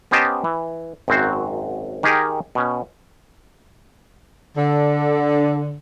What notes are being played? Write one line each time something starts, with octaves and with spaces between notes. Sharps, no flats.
B3 C#4 G4 C5 D#5 A5
E3
G#1 F#2 F#3 C4 F#4 C5
D#3 D#4 G4 G#4 A#4
B2 C#4
D3